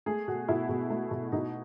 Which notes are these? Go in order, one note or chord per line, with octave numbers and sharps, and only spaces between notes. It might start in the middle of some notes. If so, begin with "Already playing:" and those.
A3 G#4
B2 F#4
B2 E4
B2
A3
B2
B2 D#4